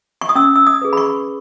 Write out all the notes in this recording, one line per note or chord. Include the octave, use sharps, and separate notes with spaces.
C#6
D#6
C#4 E6
E6
D#6
G#4 B4
B5
C#6